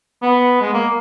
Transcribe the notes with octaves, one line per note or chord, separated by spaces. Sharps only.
B3
G#3
A#3